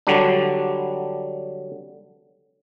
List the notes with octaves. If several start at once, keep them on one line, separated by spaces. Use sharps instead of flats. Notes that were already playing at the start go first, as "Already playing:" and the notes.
D3 F#3 G3 D4